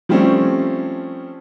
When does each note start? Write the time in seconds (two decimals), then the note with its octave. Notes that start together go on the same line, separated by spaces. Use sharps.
0.09 F3 G3 A3 C4 C#4